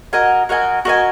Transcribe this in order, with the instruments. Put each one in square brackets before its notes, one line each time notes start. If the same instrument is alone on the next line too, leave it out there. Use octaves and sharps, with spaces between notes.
[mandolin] F#4 A#4 D#5 G#5
F#4 A#4 D#5 G#5
F#4 A#4 D#5 G#5